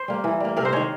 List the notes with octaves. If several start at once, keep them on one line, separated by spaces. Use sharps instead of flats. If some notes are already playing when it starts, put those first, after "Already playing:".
Already playing: C5
G3 A#3
E3
G3 A#3
C3 A#4
C5
D#3 G#3 C#5